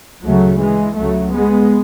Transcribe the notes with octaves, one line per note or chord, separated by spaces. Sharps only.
D2 C#3 F#3 A3
E3 G#3
C#2 C#3 F#3 A3
G#3 B3